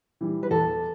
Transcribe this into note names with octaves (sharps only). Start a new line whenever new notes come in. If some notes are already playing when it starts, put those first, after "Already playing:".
E3 G3
B4
E2 A4